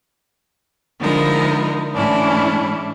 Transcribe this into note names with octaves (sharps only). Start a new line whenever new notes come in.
D3 F3 G#3 D#4 E4 A#4
A2 E3 G#3 C#4 D4 E4